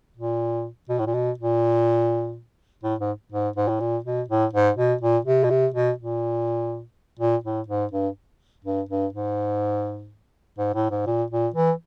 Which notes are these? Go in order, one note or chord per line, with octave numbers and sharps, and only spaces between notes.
A#2
B2
A2
A#2
B2
A#2
A2
G#2
G#2
G#2
A2
A#2
B2
A2
G#2
B2
A#2
C3
B2
C3
B2
A#2
A#2
A2
G#2
G2
G2
G2
G#2
G#2
A2
G#2
A#2
A#2
E3